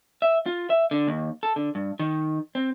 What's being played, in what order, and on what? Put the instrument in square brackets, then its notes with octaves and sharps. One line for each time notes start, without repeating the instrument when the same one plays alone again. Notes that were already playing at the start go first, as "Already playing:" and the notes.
[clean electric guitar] E5
F4
E5
D3
D#2
A4
D3
G2
D#3
C4